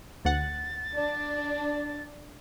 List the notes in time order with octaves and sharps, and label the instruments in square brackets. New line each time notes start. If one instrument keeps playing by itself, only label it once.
[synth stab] D2 F#5 [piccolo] A6
[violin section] D4